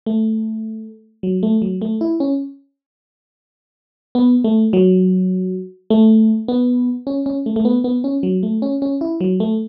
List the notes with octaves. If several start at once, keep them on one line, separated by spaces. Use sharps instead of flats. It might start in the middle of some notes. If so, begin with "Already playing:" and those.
A3
F#3
A3
F#3
A3
E4
C#4
B3
A3
F#3
A3
B3
C#4
C#4
A3
A3
B3
B3
C#4
F#3
A3
C#4
C#4
E4
F#3
A3